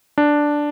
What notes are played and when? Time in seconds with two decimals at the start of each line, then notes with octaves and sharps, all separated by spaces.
0.18 D4